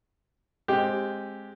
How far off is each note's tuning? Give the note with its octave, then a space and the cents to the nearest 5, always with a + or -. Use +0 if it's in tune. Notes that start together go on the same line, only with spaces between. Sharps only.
G#3 +0 C4 +15 G4 +0